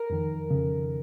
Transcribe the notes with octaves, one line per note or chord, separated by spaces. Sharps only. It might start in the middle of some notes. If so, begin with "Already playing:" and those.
Already playing: A#4
F2 D#3
F2 C#3